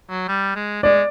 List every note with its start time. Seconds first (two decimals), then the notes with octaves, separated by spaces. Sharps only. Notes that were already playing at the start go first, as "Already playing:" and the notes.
0.09 F#3
0.28 G3
0.56 G#3
0.83 G#3 D5